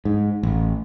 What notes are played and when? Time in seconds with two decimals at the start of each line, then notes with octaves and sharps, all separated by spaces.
0.05 G#2
0.43 A1